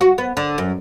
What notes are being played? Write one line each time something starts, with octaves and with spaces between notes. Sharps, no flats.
F#4
B3
D3
F#2